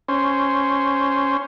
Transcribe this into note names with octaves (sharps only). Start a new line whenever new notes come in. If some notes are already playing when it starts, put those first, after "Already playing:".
C#4 C5